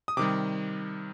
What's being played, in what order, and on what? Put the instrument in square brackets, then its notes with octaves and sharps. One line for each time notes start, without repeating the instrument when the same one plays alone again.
[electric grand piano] D#6
C3 D#3 G3 D6